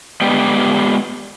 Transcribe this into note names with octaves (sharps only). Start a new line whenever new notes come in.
G#3 B3 G4 D5 G5